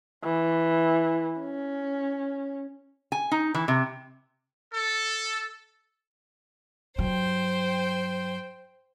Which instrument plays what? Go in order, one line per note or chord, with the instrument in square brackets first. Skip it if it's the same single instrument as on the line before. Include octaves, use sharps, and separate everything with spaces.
[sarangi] E3
C#4
[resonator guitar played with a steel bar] G#5
D#4
E3
C3
[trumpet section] A4
[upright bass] G2 F#3 [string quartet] C5 G5